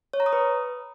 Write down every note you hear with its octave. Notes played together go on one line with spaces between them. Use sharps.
C#5
A#5
D#6
B4